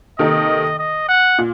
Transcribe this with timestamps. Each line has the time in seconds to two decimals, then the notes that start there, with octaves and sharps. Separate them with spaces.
0.19 C3 D#3 A#3 D#4 A4 D#5
0.79 D#5
1.09 F#5
1.38 A#2